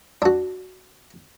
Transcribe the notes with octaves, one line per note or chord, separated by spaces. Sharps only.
D4 F#4